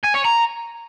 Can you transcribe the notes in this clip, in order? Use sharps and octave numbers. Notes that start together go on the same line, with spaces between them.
G#5
C#5
A#5